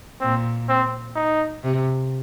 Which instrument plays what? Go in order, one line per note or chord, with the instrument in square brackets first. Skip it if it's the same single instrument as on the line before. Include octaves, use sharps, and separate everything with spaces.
[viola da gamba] A#2 [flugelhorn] C4
[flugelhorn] C4
D#4
[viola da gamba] C3